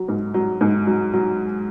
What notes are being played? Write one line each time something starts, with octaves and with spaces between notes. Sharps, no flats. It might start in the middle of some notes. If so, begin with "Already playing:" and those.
Already playing: F#3
G#2
F#3
G#2
F#3
F#3